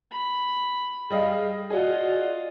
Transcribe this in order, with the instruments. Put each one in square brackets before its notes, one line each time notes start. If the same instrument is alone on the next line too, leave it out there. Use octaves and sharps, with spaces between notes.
[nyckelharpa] B5
[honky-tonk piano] G3 D#5 F5 [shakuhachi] G#4
[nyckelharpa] F4 D#5 [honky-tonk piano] F#4 G#4 [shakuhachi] D5